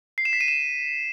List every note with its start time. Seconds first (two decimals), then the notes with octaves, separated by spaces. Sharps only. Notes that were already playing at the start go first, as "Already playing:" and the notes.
0.18 C7
0.25 E7
0.33 B6
0.41 D#7
0.48 E7